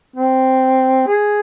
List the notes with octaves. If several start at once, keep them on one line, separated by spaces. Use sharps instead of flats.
C4
G#4